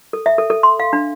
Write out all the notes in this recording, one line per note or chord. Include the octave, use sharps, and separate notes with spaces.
A4
E5
A4
A4
C6
F5
D4